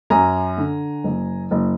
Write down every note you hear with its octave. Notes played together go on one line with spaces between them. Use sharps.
F#2 G#5 A#5
D3
F#1
F#1